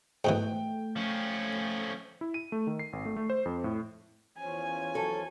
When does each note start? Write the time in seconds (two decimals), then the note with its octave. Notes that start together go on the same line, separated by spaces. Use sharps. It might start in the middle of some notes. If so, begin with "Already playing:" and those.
0.25 G#2 B2 E3 A3 G5
0.96 F3 C#4
2.21 E4
2.34 D#7
2.52 A3
2.67 D#3
2.79 C7
2.93 G#1
3.05 A3
3.16 A3
3.30 C5
3.45 F2
3.64 A2
4.38 E2 F3 C#4 G#5
4.95 F#3 A4